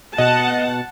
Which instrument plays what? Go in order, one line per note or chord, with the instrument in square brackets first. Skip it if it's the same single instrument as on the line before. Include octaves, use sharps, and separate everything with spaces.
[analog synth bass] B2 [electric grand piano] D#5 [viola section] F#5 A5